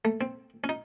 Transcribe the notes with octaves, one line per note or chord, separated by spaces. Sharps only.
A3
C4
C#4
D#4